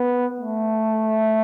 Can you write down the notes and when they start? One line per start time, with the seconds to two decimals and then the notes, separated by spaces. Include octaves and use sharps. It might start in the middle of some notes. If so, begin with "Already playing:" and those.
Already playing: B3
0.41 A3